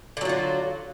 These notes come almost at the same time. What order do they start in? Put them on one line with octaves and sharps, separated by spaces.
D3 F#3 F4 F#4